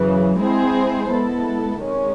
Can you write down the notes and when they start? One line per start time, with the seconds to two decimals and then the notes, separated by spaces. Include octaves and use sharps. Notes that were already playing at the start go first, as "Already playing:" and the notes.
Already playing: F#2 C#3 E3
0.38 G#3 C4 E4 G#4 C5
1.09 G#3 B3 E4 A4
1.80 C3 D#3 G#3 C#4